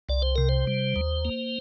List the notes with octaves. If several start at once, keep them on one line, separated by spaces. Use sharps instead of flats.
C2 D5
C5
C3 A#4
C5
G3
D#2
A#3